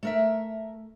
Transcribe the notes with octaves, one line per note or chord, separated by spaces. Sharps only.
A3 A#4 E5